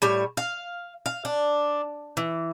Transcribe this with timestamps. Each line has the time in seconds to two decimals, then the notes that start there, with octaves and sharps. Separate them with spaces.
0.02 A2 G3 C#5
0.37 F5
1.06 F5
1.25 D4
2.17 E3